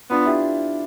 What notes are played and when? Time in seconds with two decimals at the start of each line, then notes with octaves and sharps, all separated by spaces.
0.10 B3 D4 F4
0.26 E4 G4